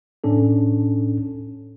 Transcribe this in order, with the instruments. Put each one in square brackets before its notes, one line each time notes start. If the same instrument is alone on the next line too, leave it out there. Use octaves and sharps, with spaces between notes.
[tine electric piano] A2 C#4 D4 A4